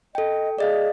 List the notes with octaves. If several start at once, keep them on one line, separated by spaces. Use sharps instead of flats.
A4 D#5 G5
G#4 D5 D#5 F5